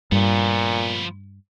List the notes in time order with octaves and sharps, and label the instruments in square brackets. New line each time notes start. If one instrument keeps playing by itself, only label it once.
[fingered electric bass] G2 [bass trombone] A#2 [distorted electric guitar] F3 B3